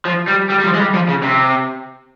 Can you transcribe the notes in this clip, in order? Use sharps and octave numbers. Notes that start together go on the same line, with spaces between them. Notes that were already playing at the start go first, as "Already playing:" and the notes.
F3
G3
G3
G3
F3
G#3
G3
F3
C#3
C3